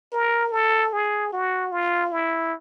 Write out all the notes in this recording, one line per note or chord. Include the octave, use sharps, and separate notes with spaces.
A#4
A4
G#4
F#4
F4
E4